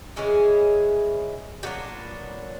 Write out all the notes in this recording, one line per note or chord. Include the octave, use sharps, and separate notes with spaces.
E3 G#3 C#4 E4 G#4
A#2 F#3 B3 D4 G4